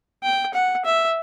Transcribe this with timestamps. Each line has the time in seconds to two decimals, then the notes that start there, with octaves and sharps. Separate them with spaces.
0.23 G5
0.54 F#5
0.85 E5